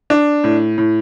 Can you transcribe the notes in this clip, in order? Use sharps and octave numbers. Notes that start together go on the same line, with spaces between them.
D4
A2
A2